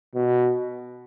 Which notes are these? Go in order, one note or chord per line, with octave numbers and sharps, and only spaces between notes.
B2